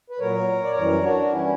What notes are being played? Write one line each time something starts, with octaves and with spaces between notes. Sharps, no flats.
B4
A#2 F#3 A#4 C#5
D5
F#2 E3 G3 A#4 C#5
D4 F#4
E3 G3 C#4 E4